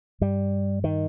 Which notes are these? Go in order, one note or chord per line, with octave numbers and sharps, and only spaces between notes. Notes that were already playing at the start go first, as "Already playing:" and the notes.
G2 G3
D#3